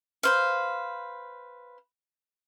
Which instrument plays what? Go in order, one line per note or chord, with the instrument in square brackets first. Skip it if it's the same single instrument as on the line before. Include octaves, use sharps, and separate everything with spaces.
[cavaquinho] B4 C5 F5